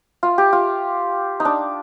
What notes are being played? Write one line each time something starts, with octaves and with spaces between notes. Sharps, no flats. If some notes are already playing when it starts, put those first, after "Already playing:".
F4
G4
F4
D#4
D4